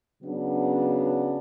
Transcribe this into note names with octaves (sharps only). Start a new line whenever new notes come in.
C#3 F#3 B3 D4